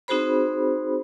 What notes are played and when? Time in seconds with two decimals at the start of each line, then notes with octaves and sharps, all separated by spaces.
0.08 C4 D#4 F#4 G#4 C5 B5